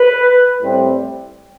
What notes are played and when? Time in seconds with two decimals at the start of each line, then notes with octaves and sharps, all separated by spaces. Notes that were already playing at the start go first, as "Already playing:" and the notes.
Already playing: B4
0.61 A2 G3 C4